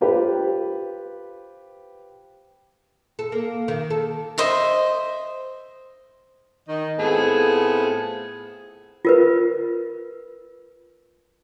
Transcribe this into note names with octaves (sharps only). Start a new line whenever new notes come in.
F4 G4 B4 C5
A4
A#3
D#3
A4
C5 D#5 E5
D#3 D#5
A2 B3 C4 F4 G#4 A4
F4 A#4 B4